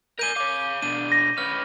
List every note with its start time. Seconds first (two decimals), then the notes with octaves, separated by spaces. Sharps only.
0.19 A#4 G#5 G6 D#7 G7
0.37 C#5 F5 D6
0.82 B2 D4 D#7
1.12 A#6
1.38 C#4 B4 F6